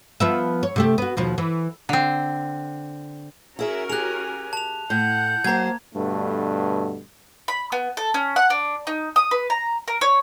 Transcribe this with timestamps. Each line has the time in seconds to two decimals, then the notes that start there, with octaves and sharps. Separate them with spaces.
0.20 F3 B3 E5
0.63 C#5
0.76 C3 A3 G4
0.98 B3 F#4
1.17 D#2 B2 F3
1.38 E3
1.89 D3 C4
3.59 C#4 E4 F#4 G#4 A#4 E5
3.89 G4 G#4 G#5 F#6 F7
4.53 A5 F7
4.90 A2 F#5 G6
5.44 F#3 A#3 C5 A#5 G#6
5.95 G2 B2 D3 A3
7.48 B5
7.72 B3
7.97 A4
8.14 C#4
8.36 F#5
8.50 D4
8.87 D#4
9.16 D#6
9.31 B4
9.50 A#5
9.88 A#4
10.01 C#5